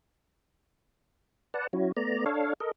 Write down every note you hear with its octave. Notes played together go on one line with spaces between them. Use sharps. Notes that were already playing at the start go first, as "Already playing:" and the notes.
B4 D5 F#5 A5
F#3 C#4 E4 F#4
A3 B3 D5 A#5
D4 A4 C#5 F5
A4 A#4 D#5